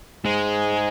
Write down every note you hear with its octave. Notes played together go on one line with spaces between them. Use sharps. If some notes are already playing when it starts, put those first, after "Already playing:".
G#2 G#3